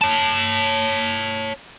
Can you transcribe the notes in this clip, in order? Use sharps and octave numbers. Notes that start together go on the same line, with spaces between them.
C#5 A5